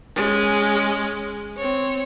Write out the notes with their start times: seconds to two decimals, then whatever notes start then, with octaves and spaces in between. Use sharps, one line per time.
0.16 G#3 C#4
1.57 C4 C#5